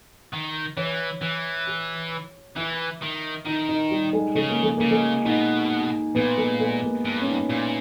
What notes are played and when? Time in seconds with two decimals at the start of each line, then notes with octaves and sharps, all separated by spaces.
0.33 D#3
0.77 E3 C#5
1.21 E3
1.67 G4
2.56 E3 E4
3.02 D#3
3.46 D#3 D#4
3.69 D#4
3.91 G3
4.13 G#3
4.35 C#3 G#3
4.50 A#3
4.63 G#3
4.77 C#3 A#3
4.91 G#3
5.25 B2 D#4
6.15 A#2 B3
6.37 G#3
6.60 G#3
6.83 A#3
7.05 G2
7.21 C#4
7.27 D#4
7.49 A#2 E4